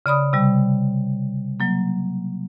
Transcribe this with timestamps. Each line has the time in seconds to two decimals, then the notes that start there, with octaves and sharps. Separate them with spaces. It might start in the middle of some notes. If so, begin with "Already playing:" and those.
0.06 C#3 D5 B5 D#6
0.33 C3 G3
1.60 F#3 A#3